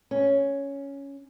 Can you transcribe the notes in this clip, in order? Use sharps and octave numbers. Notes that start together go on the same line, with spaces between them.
C#4